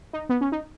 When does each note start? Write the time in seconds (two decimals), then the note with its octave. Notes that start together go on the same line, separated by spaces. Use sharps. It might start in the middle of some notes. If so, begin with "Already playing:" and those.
0.13 D#4
0.29 B3
0.41 C#4
0.52 D#4